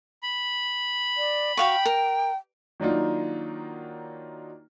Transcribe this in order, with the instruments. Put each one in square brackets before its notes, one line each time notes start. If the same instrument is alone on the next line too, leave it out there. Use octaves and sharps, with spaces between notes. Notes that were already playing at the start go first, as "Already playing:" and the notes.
[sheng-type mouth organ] B5
[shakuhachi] D5
[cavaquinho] F#4 F5 C#6 [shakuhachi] G5
[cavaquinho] A#4
[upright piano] D#3 F#3 A#3 D4 D#4 F4